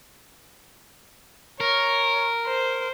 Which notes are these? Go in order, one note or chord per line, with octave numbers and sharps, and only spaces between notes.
A#4 C#5
C5